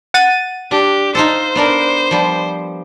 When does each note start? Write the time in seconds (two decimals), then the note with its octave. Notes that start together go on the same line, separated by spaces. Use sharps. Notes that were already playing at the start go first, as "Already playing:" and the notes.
0.14 F#5 A6 D#7
0.71 D4 G4
1.15 D#4 F4 A4 C5
1.55 B3 D4 A#4
2.11 F3 G3